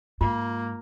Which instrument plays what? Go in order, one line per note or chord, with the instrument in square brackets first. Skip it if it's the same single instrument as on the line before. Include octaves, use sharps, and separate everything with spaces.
[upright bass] G#2 [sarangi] A#3 [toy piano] F4